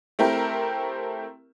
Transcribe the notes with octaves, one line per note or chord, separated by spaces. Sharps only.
A3 C4 E4 G4 A#4